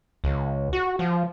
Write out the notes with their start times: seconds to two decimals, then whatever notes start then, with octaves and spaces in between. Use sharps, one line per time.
0.24 C#2
0.73 F#4
0.99 F3